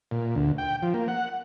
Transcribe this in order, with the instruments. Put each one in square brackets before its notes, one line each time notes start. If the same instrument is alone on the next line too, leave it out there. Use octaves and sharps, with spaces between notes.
[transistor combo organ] A#2
D2
G5
F3
A#3
F#5